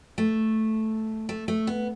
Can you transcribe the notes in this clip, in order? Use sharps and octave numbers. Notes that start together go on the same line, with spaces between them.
A3
A3
A3
B3